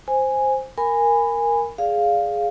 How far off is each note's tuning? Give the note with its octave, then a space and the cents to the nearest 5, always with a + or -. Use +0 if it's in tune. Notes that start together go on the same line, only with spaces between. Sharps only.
C5 +0 G#5 -5
A#4 +0 G#5 -15 B5 +15
G#4 +0 D5 +0 F5 +0